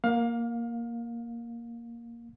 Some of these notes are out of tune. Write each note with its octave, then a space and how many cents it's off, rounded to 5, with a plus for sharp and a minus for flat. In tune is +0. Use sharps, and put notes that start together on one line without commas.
A#3 +0 F5 +25